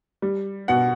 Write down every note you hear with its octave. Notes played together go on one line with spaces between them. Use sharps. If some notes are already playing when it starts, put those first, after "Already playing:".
G3
B2 F#5